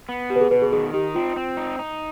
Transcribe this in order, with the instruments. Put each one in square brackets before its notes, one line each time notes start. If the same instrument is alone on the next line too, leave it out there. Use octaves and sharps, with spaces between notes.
[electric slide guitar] B3
[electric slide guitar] B2 [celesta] G4
[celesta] B4
G#4
[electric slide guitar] B2 [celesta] B4
[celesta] G#4
[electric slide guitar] D#3 [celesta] G#4
[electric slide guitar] D#4 [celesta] G4
[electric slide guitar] C4 [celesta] F4
[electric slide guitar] C4
D#4
D#4